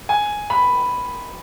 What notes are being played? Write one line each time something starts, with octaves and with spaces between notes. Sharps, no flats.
G#5
B5